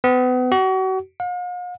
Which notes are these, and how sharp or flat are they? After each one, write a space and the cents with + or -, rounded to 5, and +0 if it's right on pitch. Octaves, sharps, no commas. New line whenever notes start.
B3 +35
F#4 +35
F5 +45